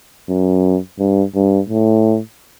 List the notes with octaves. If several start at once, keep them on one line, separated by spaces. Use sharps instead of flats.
F#2
G2
G2
A2